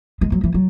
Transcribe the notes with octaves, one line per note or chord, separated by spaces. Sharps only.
G#3
F#3
E3
F#3